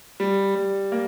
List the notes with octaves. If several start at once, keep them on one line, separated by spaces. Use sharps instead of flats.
G3
G3
A#3